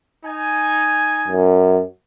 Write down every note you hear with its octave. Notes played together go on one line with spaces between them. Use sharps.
D#4 G#5
F#2